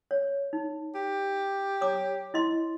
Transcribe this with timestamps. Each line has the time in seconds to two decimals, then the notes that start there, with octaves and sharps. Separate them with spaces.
0.11 C#5
0.53 D#4
0.95 G4
1.81 C#5 A#5 D6
2.34 E4 D#5 C6